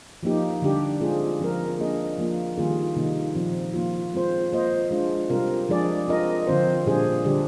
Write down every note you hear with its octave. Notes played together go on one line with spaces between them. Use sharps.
F3 A#3 D#4 G4
D3 G3 D4 G4
G#3 C4 F4 G#4
F3 C4 F4 A#4
A#3 D4 G#4 D#5
F3 A#3 F4
D#3 G3 A#3 F4 G#4
C3 D#3 G3 A#3 D#4
A#2 F3 C4
F3 A#3 F4
G#3 C4 F4 C5
A#3 F4 C5 D#5
G#3 D4 F4
C3 G3 C4 F4 A#4
F3 G#3 D4 G#4 D5
C4 F4 A#4 D#5
D3 F3 C4 F4 C5
A#2 G3 D4 G#4 C5
D3 G3 D4 G4